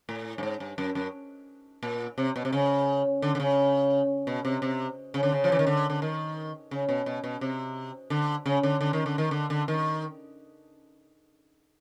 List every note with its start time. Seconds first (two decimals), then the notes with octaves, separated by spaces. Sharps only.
0.09 A2
0.38 G2
0.43 G#2
0.60 G2
0.78 F#2
0.95 F#2
1.83 A#2
2.18 C3
2.36 B2
2.45 C3
2.53 C#3
3.22 D3
3.35 D3
3.40 C#3
4.27 B2
4.45 C3
4.62 C3
5.14 C#3
5.23 D3
5.32 C#3
5.44 F3
5.52 E3
5.59 D#3
5.67 D3
5.90 D3
6.02 D#3
6.71 C#3
6.89 B2
7.06 B2
7.24 B2
7.41 C3
8.10 D3
8.46 C#3
8.63 D3
8.81 D3
8.93 D#3
9.06 D3
9.18 D#3
9.31 D3
9.50 D3
9.68 D#3